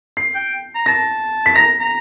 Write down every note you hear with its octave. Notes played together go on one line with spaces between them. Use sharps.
C7
G5
A#5
A5 A#6
B6
A#5 A#6
A#5